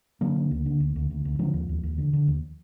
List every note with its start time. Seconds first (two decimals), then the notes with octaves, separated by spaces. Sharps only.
0.21 D3 F#3 A#3
0.36 D3
0.51 D2
0.66 D3
0.80 D2
0.96 D2
1.10 D2
1.25 D2
1.39 D3 F3 G#3
1.54 D#2
1.69 D#2
1.83 D#2
1.98 D3
2.13 D3
2.28 D#2